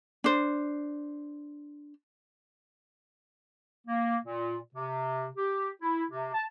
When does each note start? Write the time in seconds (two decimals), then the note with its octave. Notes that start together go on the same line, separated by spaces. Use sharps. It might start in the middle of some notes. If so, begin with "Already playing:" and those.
0.24 D4 C5
3.87 A#3
4.25 A#2
4.75 C3
5.37 G4
5.82 E4
6.11 C3
6.33 A5